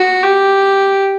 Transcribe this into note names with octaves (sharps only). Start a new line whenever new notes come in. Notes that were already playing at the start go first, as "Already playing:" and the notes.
Already playing: F#4
G4